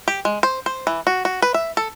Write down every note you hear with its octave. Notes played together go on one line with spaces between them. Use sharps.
G4
G#3
C5
C5
E3
F#4
F#4
B4
E5
A4